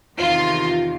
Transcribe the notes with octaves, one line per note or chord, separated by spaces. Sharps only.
E2 C3 D#3 F4